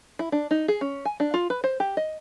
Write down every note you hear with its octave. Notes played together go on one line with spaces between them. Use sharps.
E4
D4
D#4
G#4
C#4
G#5
D4
F4
B4
C5
G4
D#5